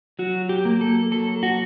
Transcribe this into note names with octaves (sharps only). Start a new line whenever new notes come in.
F#3 F#4
G4
A#3
A4
F#3 A4
F#4